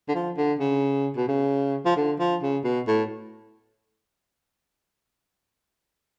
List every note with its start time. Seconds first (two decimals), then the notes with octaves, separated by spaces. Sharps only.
0.09 D3
0.15 F3
0.37 D3
0.60 C#3
1.17 B2
1.28 C#3
1.85 F3
1.97 D3
2.20 F3
2.42 C#3
2.64 B2
2.88 A2